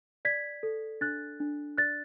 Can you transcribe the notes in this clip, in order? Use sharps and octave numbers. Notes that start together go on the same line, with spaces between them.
D5 G#6 B6
A4
D4 F#6 A6
D4
D5 F#6 A6